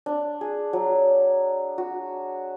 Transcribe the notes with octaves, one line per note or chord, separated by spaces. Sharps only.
D4
G#4
F#3
F#4